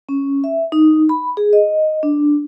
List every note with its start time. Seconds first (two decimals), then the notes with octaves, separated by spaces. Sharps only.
0.09 C#4
0.44 E5
0.72 D#4
1.09 B5
1.37 G#4
1.53 D#5
2.03 D4